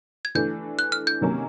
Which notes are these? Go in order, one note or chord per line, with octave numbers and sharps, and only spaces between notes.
G#6
E3 A3 D4 G6
F#6
F6
G6
C3 D#3 F#3 A#3 C#4